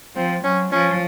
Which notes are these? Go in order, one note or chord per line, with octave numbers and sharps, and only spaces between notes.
F3 C4
F#3 C#4
F3 C#4